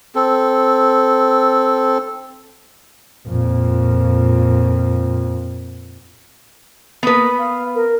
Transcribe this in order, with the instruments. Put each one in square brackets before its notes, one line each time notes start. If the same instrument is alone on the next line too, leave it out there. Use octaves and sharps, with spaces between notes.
[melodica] C4 A4
[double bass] F2 A#2
[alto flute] A#3 [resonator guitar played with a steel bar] B3 B4
[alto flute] F5
A#4